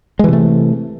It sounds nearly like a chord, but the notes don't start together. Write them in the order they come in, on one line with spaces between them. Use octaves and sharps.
G#3 E3 C3 A3